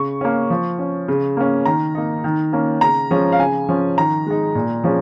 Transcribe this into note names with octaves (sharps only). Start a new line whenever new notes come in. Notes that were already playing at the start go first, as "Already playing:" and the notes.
Already playing: C#3 C#6
A#3 C#4
F3
C#4
C#3
A#3 C#4
D#3 A#5
A#3 D#4
D#3
A#3 C#4
C#3 A#5
F3 G#3 C#4
F5
C#3 G#5
F3 C#4
D#3 A#5
G#3 D#4
A#2
F3 G#3 C#4